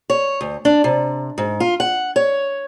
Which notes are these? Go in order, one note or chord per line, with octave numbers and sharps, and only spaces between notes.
C#5
D2
D4
C3
G#2
F4
F#5
C#5